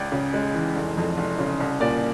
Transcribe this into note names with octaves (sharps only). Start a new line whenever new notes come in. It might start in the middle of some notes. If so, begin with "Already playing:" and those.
Already playing: C#2 D5
C#3
G#3
E3
F1
F2
F1
C#3
C2
A#2 D5